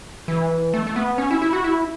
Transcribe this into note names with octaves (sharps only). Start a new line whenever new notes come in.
E3
A3
A3
B3
C#4
E4
E4
F#4
E4